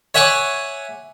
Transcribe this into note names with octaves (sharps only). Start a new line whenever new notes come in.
C#5 E5 F#5 G#5 C#6 D6